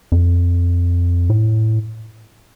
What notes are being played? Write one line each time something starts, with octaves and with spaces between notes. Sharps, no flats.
F2
A2